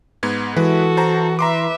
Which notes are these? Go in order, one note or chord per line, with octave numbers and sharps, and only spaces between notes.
G#2 B3 G#6
E3 G#3 F#4 A4 B4
C5 A5 A#5
B4 E5 A#5 C6 D6